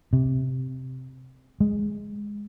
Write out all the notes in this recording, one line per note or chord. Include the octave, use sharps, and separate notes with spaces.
C3
G#3